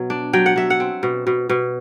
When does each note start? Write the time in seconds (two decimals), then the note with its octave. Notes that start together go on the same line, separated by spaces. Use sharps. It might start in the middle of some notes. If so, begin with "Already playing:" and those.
Already playing: B2 F#3
0.10 D4
0.33 F#3 G5
0.46 F#5
0.56 F#3 E5
0.70 F#5
0.80 C4
1.03 B2
1.27 B2
1.49 B2